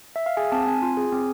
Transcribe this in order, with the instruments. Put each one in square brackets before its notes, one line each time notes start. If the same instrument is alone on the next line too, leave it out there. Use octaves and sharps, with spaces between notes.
[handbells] E5
F5
G#4 G#5
C4 A5
C4 G#5
F4
G#4
C4